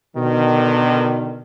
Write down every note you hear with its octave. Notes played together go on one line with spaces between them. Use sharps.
B2 D3 D#3